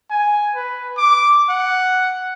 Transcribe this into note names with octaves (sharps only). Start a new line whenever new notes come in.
G#5
B4
D6
F#5